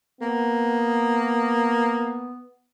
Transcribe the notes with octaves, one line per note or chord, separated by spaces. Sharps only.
A#3 B3